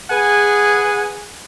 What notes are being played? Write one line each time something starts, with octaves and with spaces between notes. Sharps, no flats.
G#4 B4 F#5 G#5